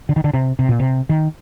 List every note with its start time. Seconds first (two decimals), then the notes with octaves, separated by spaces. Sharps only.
0.09 D3
0.16 D#3
0.24 D3
0.34 C3
0.59 C3
0.69 A#2
0.79 C3
1.09 D#3